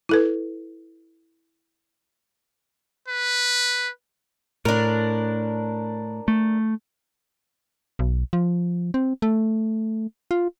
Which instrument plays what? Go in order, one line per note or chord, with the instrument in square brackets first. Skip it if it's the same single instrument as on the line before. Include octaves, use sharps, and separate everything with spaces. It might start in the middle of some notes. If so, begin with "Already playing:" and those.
[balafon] E4 A4 B4
[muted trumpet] B4
[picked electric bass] A2 [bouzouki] D4 A#4
[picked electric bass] A3
[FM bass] B1
F3
C4
A3
F4